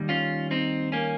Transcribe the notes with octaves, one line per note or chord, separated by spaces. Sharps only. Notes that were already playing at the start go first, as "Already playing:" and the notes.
Already playing: D#2 D#3 G3
C#4 F4
C4 D#4
A#3 C#4